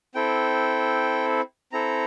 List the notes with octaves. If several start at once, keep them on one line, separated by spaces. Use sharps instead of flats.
C4 E4 A4 G5
C4 E4 A4 A#5